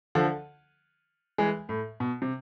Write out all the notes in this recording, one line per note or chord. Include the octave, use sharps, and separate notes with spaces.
D3 F3
E3 G#3
A2
B2
C3